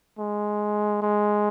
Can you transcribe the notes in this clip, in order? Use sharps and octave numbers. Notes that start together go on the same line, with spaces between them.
G#3
G#3